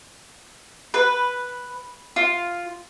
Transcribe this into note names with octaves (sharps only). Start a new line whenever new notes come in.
B4
F4